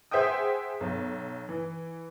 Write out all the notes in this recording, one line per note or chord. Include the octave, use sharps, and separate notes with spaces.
G#4 C5 E5 F#5 G5 D#6
B1
E3